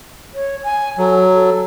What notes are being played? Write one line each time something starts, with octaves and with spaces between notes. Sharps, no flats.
C#5
G#5
F#3 A4
A4